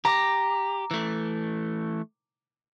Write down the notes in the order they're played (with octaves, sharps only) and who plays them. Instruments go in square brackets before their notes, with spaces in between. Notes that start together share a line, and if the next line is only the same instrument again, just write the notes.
[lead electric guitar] G4 [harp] A#5 D6
[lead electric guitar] E3 A3